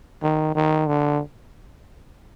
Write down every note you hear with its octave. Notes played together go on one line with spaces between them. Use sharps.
D#3
D#3
D3